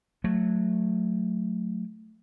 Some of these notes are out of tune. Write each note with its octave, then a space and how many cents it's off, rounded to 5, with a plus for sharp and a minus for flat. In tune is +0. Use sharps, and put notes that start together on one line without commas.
F#3 -15 A3 +0